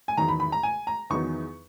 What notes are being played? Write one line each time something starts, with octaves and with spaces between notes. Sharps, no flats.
G#5
E2 D#3 F#3 A#5
B5
B5
A#5
G#5
A#5
E2 D#3 F#3 B3 D#4 C#6